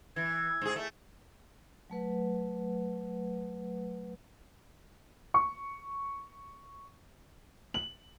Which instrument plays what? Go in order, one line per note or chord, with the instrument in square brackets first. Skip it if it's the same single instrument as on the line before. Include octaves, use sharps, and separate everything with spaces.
[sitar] E3 [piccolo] G#6
[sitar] G#2 G#4
A3
[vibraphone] F#3 A3 B4 F#5
[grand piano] C#6
F#7